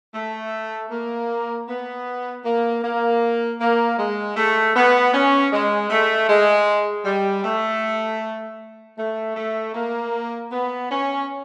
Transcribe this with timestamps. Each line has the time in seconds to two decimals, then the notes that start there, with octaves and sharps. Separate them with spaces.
0.15 A3
0.91 A#3
1.68 B3
2.45 A#3
2.84 A#3
3.60 A#3
3.98 G#3
4.37 A3
4.75 B3
5.14 C#4
5.52 G#3
5.91 A3
6.29 G#3
7.05 G3
7.44 A3
8.97 A3
9.36 A3
9.75 A#3
10.52 B3
10.91 C#4